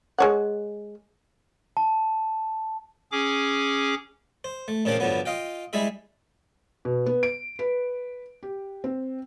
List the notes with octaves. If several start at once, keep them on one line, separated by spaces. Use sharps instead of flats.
G#3 C#5 F#5
A5
C#4 G#4 D6
C5
A3
A#2 C#3 F3 A#3 D4 G4
G2 D3 F3 F#3 B3
F4 D#5 F5 G5
G3 G#3 E4 G#4 E5
B2
B3
D7
B4
G4
C4